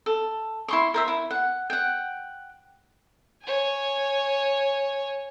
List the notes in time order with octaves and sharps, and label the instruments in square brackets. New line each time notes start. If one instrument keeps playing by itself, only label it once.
[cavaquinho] A4
E4 C6 C#6
A#4 C5 E5
E4
F#5
F#5 G5
[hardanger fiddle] C#5 G#5